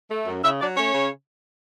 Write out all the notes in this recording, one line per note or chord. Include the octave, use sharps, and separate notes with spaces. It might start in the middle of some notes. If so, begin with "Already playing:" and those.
A3
F#2
C#3 E4 E5
F#3 D4 D5
A3 C#4 C#5
C#3